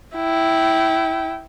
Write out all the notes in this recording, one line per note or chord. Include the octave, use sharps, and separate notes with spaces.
E4 G5